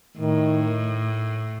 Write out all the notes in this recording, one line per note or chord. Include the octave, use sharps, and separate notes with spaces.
A2 D#3